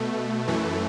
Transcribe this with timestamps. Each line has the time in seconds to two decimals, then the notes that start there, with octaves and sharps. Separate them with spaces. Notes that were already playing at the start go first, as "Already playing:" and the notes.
Already playing: B2 A3
0.47 F#2 E3 A3